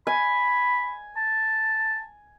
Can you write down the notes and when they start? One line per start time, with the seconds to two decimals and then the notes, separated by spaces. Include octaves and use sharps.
0.07 G#5 B5
1.16 A5